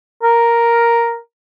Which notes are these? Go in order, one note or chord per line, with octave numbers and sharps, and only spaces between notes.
A#4